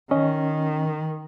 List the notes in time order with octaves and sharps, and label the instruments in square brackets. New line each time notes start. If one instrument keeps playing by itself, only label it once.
[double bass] D#3 [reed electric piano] C#4 D#5